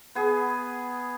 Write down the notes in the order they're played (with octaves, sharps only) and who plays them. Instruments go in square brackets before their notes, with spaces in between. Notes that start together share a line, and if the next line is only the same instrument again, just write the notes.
[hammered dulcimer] B3 G#4